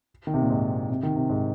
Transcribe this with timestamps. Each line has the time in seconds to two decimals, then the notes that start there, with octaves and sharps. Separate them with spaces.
0.27 D#3
0.34 C3
0.42 A#2
0.50 G#2
0.90 C3
1.03 D#3
1.16 C3
1.29 G#2